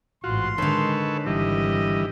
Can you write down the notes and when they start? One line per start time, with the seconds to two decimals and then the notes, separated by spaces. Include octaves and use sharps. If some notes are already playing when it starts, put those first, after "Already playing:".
0.24 A1 G#2 F4 F#4 C6
0.58 D3 D#3 G#3 D#4 A4 B4 C#5
1.26 G#1 E3 G3 D#5